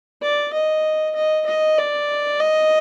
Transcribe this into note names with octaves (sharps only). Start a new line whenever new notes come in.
D5
D#5
D#5
D#5
D5
D#5